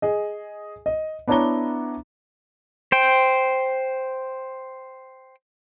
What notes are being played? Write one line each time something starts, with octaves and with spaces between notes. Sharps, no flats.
G#4 D#5
D#5
B3 D4 E4 C#5 A#5 G7
C5 G5